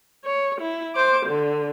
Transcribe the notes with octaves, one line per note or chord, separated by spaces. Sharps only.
C#5
E4
C5 D6
D3